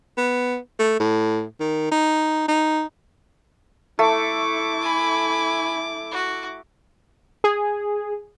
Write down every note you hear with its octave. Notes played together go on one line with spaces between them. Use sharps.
B3
A3
A2
D#3
D#4
D#4
A3 E4 D6
G#5 B5
F#4
G#4